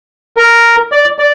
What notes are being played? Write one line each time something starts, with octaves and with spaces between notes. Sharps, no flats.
A#4
D5
D5